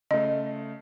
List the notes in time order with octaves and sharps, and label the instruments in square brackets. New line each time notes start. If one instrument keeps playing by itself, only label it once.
[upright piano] C#3 A3 [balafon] D#5